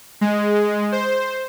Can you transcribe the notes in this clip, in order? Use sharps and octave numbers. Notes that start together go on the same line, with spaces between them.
G#3
C5